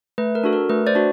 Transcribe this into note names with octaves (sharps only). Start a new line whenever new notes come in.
A3 B4
A#4
D4 F#4 A4
A#4
A3 B4
C5 D5
D4 F#4